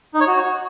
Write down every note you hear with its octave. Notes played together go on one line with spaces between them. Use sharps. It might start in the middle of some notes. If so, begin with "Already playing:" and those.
D#4
C#5
F#4